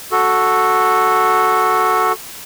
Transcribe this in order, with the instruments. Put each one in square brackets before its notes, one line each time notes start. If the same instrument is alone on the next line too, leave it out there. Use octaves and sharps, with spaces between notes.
[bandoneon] F#4 A4